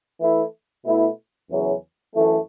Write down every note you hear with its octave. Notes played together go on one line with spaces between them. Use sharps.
E3 A3 E4
B2 A3 E4
E2 C#3 F#3 C#4 E4
F#2 E3 A3